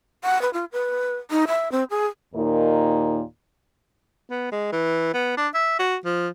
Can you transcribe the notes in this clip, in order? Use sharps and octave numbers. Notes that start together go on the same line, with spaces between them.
F#5
B4
F4
B4
D#4
E5
C4
G#4
D#2 A#2 D#4 A#4
B3
G#3
E3
B3
D4
E5
F#4
F3